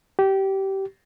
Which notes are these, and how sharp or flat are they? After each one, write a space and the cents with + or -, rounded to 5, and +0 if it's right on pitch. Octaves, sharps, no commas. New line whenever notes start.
G4 -20